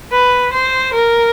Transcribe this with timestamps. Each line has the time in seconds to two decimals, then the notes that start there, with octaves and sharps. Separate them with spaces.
0.12 B4
0.52 C5
0.93 A#4